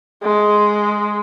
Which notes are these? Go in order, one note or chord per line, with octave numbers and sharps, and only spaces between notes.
G#3